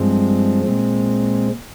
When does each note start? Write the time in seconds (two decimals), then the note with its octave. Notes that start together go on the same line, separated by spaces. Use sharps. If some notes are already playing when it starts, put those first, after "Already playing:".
Already playing: G2 F3 G#3 C4
0.64 A#2 G#3 C4